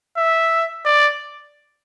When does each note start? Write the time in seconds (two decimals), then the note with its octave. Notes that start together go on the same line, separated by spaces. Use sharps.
0.17 E5
0.85 D5